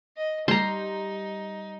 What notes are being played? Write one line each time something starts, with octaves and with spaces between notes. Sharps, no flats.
D#5
G3 D#4 A#5 C6 G6